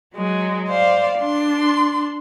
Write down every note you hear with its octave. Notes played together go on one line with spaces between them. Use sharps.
F#3 G#3
C5 D5 F5
D4 C6